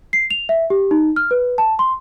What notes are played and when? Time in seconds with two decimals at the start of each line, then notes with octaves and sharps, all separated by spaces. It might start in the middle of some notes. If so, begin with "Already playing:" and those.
0.13 C7
0.31 F7
0.49 E5
0.70 G4
0.91 D#4
1.16 F6
1.31 B4
1.58 A5
1.79 C6